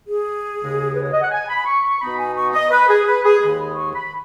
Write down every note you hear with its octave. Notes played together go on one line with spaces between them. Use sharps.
G#4
D#2 C#3 G#3
B4
C#5
D#5
F#5
G#5
B5
C#6
C#6
B2 B3 D#4 B5
G#5
C#6
D#5
B4
G#4
B4
G#4
D#2 D#3 G#3 B5
C#6
B5